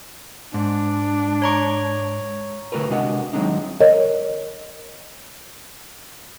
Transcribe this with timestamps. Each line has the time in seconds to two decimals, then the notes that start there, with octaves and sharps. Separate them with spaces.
0.54 G#2 D4
1.42 C#5 A#5 C#6
2.72 D3 A3 F#4 A#4 B4
2.90 C3 G#3 D4 F#4 D#5 F#5
3.33 D#3 F#3 G#3 C4 D4 D#4
3.81 A#4 C#5 D#5